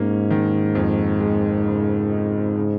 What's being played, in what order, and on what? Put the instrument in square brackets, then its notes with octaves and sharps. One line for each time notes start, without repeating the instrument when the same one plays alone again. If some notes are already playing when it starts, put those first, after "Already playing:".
Already playing: [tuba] G#2 [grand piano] A#3 C#4
[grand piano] D#3
F2
G#3
C#3
D#4
C#3